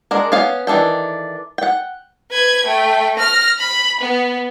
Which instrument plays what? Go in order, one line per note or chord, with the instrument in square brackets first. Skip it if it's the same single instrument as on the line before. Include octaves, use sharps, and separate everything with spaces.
[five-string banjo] G#3 D4 A#4
B3 C#4 F5
D#3 E3 D4 A4 G5
F#5 G5
[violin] B4 G#6
A3 G5
F6 A#6
B5
B3